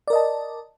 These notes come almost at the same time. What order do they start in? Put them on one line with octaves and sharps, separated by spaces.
D5 A#4 D#5 A5